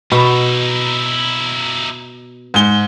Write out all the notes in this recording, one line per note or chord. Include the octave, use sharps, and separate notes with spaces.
B2 D#4 E4 B5
G#2 G7